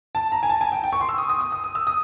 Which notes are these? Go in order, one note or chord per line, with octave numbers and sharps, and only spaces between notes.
A5
A#5
G#5
A5
G#5
G5
G5
C#6
C6
E6
D#6
D#6
D#6
D#6
D#6
E6
D#6